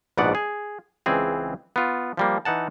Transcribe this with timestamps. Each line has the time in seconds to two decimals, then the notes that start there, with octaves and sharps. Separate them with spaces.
0.17 A#1 G#2 B2 B3 D5 F#5
0.35 G#4
1.06 C#2 E3 C4 G#4
1.76 B3 F4
2.17 F3 G3 A#3
2.45 E3 D#4 F#5 A5